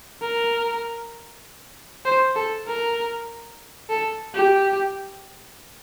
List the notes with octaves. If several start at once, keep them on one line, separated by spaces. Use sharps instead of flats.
A#4
C5
A4
A#4
A4
G4